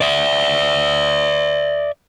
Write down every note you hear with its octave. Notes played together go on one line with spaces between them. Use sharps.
D5 E5